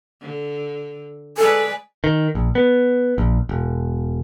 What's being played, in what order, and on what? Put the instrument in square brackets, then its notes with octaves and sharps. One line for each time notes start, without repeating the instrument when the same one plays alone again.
[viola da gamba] D3
[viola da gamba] G#3 B4 D5 [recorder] A4 [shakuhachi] G#5
[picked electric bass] D#3
A#1
B3
A#1
E1